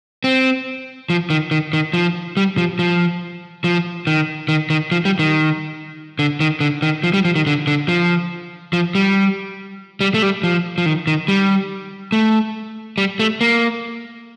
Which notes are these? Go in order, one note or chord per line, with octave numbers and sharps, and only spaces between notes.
C4
F3
D#3
D#3
D#3
F3
G3
F3
F3
F3
D#3
D#3
D#3
F3
G3
D#3
D3
D#3
D3
D#3
F3
G3
F3
D#3
D3
D3
F3
F3
G3
G3
A3
G3
F3
F3
D#3
D#3
G3
A3
G3
A3
A#3